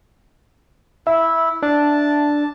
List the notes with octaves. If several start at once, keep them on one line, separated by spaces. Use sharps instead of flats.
E4 E5
D4 A5